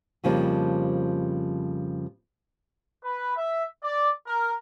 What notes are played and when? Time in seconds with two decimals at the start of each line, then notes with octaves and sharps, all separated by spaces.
0.24 F2 C#3 F3 G3 A#3
3.04 B4
3.37 E5
3.82 D5
4.27 A#4